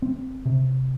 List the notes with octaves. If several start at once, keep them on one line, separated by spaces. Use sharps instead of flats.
C4
C3